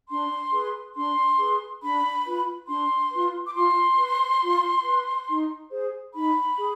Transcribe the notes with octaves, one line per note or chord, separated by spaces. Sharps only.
D4 C6
G#4 B4
D4 C6
G#4 B4
D4 B5
F4 B4
D4 C6
F4 B4
D6
F4 C6
B4
F4
B4
D#4
G#4 C5
D#4 B5
G#4